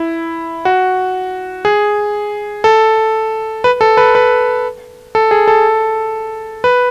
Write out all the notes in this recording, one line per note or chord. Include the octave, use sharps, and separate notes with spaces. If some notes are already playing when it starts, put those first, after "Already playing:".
Already playing: E4
F#4
G#4
A4
B4
A4
B4
B4
A4
G#4
A4
B4